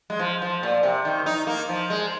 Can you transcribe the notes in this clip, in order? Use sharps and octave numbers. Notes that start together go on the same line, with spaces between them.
G#3
F3
F3
A#2
C3
D#3
D#4
A#3
F3
G#3